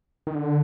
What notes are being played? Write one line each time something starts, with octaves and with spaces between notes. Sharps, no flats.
D#3
D3